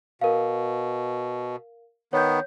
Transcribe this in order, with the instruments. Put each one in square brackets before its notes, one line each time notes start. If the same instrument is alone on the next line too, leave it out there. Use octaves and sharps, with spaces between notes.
[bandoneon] B2 [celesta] A#4 F5
[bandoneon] D#3 B3 [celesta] C#5 G6